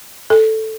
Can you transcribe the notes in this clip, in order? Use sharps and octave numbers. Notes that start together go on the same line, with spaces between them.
A4